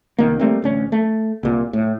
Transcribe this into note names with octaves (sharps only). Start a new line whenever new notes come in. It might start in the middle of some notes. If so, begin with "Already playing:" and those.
C2 D#3 A#3
G3 A3 A#3 C4
A1 D2 C#4
A3
C2 A#2
A2